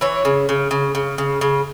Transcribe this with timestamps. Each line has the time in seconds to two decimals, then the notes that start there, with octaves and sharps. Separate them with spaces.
0.01 E3 C#5
0.25 C#3
0.49 C#3
0.71 C#3
0.95 C#3
1.18 C#3
1.41 C#3